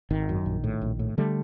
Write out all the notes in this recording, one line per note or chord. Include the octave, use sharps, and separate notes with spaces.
G#1 D#3
F#2
A#1
A2
A#1
A2
D3 G3 A3